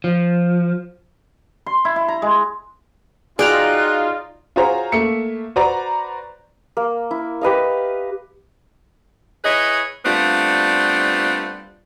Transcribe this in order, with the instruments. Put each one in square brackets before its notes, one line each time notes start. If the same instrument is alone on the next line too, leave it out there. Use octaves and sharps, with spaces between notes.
[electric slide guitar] F3
[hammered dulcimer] C6
E4
E4
A#5
G#3
[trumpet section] D#4 F4 [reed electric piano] F#4 G#4 [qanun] D5 G5 A#5 [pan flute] F#6
[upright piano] F4 F#4 G#4 C5 C#5 A#5
A3 A#3 E5 C#7
F#4 B4 C5 D5 A#5
[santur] A#3
E4
G4 B4 D#5 F5
[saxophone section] E4 G#4 B4 C#5 D#5
G3 A3 B3 C4 D4 F4